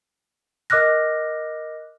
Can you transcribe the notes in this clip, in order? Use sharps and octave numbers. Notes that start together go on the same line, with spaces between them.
A#4 D#5 D6 F6 F#6 A#6